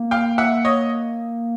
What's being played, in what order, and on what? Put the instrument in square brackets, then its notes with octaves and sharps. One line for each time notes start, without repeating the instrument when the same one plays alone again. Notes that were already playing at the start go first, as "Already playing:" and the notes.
Already playing: [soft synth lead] A#3
[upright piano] F5 G5
E5 F#5
C#5 D#5